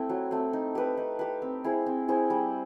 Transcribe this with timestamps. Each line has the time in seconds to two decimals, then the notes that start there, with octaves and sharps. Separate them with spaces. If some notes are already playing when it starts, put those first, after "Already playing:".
Already playing: A3 C4 E4
0.09 F#3
0.31 A3 C4
0.53 D#4
0.75 G4 B4
0.97 D#4
1.19 G4 B4
1.42 C4
1.64 E4 G#4 C5
1.86 C4
2.08 E4 G#4 C5
2.30 G3